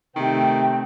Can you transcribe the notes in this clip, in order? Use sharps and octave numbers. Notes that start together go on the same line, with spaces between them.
C3 D#3 A3 C4 G5